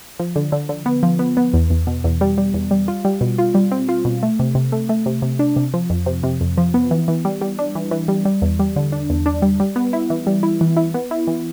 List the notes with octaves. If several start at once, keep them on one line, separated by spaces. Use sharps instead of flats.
F3
D3
D3
D3
B3
F3
B3
B3
E2
E2
B2
E2
G3
G3
E2
G3
F4
G3
B2
F4
G3
C4
F4
B2
A3
C3
C3
A3
A3
C3
C3
D4
C3
F3
F2
C3
C3
F2
F3
B3
E3
E3
G3
G3
D4
E3
E3
G3
G3
E2
G3
D3
D4
E2
D4
G3
G3
B3
E4
E3
G3
E4
E3
E4
B3
E4
E3